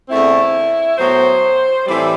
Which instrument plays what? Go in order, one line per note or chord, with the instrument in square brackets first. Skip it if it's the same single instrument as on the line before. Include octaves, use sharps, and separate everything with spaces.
[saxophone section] E2 D3 A3 C4 E4
A2 F#3 B3 C5
A2 E3 G3 C4 D5